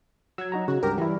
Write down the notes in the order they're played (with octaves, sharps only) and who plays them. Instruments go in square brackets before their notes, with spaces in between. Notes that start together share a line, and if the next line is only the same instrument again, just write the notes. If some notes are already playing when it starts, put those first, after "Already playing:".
[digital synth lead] F#3 [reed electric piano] E6 G#6
[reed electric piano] D#4 F#4 A#5
[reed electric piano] C#3 [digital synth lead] F#4
[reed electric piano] C#2 G2 G4 [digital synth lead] A#4
[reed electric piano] E3 E4 [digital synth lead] G3